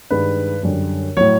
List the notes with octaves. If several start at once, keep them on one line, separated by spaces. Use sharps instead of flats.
G2 D#3 G#3 B4
F#2 D3 G3
A2 F#3 C#5